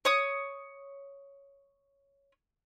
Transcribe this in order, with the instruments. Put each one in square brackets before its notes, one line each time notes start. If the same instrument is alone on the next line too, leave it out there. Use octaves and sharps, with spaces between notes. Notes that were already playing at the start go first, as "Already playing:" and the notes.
[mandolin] C#5 D#6